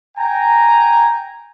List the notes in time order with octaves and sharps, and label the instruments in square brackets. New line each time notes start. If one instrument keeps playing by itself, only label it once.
[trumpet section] G5 G#5 A#5